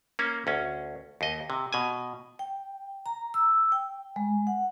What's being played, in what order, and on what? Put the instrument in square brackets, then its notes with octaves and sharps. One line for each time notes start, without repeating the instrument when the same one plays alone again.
[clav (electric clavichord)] A#3 C#4
D2 C#4
D#2 D#5
C3
B2 G#5
[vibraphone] G5
A#5
E6
G5
G#3
F#5